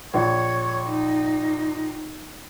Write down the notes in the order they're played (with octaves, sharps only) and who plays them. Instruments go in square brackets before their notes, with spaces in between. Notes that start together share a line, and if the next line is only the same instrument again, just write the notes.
[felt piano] A#1 [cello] C#5
[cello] D#4